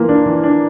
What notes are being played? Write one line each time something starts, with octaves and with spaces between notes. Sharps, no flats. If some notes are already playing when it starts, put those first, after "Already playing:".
Already playing: E3 A#3 F4
D4
E3
D4